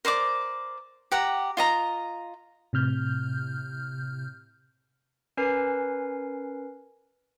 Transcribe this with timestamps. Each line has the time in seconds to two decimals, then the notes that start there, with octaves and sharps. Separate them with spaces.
0.05 A#4 C5 D5 D6
1.12 G4 F#5 A#5
1.57 F4 D#5 A#5
2.73 A2 C3 F6 G6
5.37 C#4 A#4 B4 G#5 C7